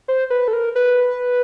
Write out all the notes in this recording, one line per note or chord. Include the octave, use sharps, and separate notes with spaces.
C5
B4
A4
A#4
B4